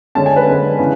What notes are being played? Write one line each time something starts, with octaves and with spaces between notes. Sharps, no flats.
D3 G#3 C#4 A5
G#5
B4
D3 G#3 C#4
C#3 E3